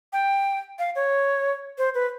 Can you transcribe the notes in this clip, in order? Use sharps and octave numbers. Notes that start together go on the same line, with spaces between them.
G5
F5
C#5
C5
B4